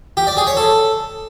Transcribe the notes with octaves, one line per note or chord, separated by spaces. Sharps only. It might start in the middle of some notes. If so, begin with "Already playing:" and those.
G4
D5
G#4
C#5
A4